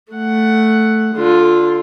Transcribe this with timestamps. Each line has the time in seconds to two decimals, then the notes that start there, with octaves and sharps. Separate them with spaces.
0.13 A3 F#5
1.15 D3 F4